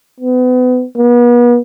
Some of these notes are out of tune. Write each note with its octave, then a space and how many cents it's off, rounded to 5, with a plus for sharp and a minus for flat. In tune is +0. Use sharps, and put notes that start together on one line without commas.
B3 +30
B3 -40